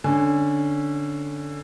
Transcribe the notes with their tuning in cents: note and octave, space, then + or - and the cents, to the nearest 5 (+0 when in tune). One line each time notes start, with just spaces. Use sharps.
D3 +0 C#4 +0 G#5 +0